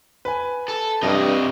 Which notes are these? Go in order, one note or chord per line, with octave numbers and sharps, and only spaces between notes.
B4 G#5
A4
G2 C3 D#5